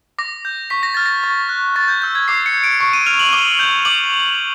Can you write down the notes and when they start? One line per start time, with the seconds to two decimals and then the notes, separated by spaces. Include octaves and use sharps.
0.19 D6 A#6
0.45 G6
0.70 C#6 B6
0.83 A#6
0.94 F6 A6
1.06 A#6
1.23 C#6 A6
1.49 F#6
1.76 C#6 A6
1.88 G6
2.02 E6 G6
2.15 G#6
2.28 D6 C7
2.46 C#7
2.54 G6
2.63 D7
2.80 C#6 D7
2.93 D#7
3.06 F6 F7
3.19 F#7
3.33 D6 G7
3.59 G6
3.85 D6 F#7